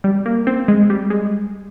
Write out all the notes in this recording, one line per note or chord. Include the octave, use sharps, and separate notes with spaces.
G3
A#3
C4
G#3
G3
G#3